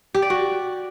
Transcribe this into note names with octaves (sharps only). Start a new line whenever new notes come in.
G4
D5
F#4